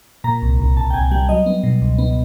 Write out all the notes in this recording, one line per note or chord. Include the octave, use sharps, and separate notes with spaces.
A#2 A#5
C2
C2
C2 A5
G5
C2 G#5
G3 G5
F#3 D#5
B3
B2
C#2
B3